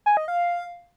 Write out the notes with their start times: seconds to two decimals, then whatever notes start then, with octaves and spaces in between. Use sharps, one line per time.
0.06 G#5
0.17 D#5
0.28 F5